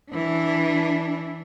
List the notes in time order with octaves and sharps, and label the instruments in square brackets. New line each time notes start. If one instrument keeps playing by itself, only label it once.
[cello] E3 D4